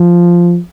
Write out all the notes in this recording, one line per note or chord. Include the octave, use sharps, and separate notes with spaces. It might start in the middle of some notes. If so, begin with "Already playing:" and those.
Already playing: F3